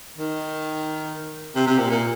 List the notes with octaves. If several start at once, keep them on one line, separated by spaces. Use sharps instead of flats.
D#3
C3
C3
A#2
A#2